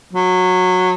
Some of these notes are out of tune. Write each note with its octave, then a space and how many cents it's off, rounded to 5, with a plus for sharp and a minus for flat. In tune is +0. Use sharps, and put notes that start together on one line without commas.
F#3 -15